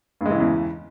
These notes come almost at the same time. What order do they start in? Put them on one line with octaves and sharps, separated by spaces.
G2 G#3 E3 C#3 E2